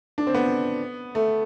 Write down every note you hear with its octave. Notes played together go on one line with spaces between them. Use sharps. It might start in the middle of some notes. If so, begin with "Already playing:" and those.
D4
C4
B3
A3